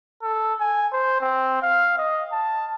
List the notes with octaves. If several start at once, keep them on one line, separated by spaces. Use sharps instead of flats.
A4
G#5
C5
C4
F5
D#5
A5